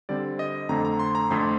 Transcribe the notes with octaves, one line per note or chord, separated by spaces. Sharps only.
D3 G3 C4 D5
D#5
F2 D3 A3 C4 A#5
A#5
C6
A#5
F2 D3 A3 C4 C6